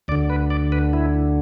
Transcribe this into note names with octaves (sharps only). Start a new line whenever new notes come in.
D2 D3 D5
B4
D5
B4
E4